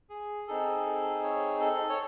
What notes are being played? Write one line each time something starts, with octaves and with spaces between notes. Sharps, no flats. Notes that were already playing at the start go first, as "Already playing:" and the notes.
G#4
C4 D#4 G#4 A4
A4
C#5
A4
C#5